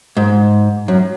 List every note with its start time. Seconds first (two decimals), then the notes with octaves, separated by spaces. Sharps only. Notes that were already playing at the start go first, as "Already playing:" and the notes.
0.17 G#2
0.88 F#2